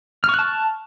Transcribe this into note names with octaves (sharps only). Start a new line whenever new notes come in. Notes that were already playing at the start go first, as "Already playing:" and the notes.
A5 C#6 F6 F#6